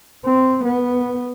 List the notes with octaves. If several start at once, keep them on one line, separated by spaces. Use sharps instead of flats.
C4
B3